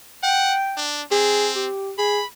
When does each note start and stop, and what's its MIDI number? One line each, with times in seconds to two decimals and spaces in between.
0.23 0.56 78
0.23 0.85 79
0.77 1.02 62
1.11 1.69 60
1.11 1.49 68
1.55 1.92 67
1.98 2.21 68
1.98 2.26 83